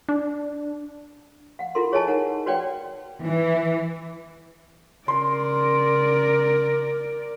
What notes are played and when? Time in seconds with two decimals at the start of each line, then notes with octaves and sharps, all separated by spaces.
0.09 D4
1.59 F5 F#5
1.75 E4 F4 A4 A#4 C6
1.92 G#4 C#5 D#5 G#5 A5
2.08 D#4 A#4 F#5
2.46 F#4 B4 C#5 D5 F#5 G5
3.22 E3
5.08 C#3 A#4 D5 C6